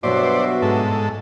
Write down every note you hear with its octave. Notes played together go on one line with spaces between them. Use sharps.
G2 B2 F#3 B3 F#4 C5 D5 E5
G#2 A4